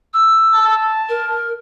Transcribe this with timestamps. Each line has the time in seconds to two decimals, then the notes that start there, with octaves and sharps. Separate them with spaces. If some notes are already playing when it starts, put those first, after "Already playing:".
0.13 E6
0.54 A5
1.09 A#4